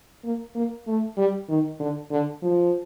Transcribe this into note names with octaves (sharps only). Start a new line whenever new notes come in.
A#3
A#3
A3
G3
D#3
D3
D3
F3